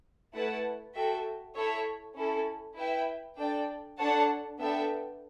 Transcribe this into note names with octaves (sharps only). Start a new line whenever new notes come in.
A3 E4 B4 F#5 A5
F#4 A4 E5 G5
E4 A4 C#5 E5
C#4 E4 A4
E4 B4 E5 G5
D4 A4 D5 G5
D4 A4 C#5 F#5 A5
B3 D4 A4 E5 G5